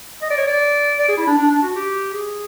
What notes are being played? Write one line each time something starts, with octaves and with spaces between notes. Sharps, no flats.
D#5
D5
C#5
D5
D5
G#4
E4
D4
D4
D4
F#4
G4
G#4